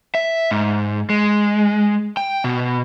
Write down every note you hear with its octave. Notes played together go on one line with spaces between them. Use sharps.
E5
G#2
G#3
G5
B2